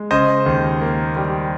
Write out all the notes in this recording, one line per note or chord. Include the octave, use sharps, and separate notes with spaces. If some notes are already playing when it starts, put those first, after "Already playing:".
Already playing: G#3
C#3 C5 D#5
D#2
A#3
G3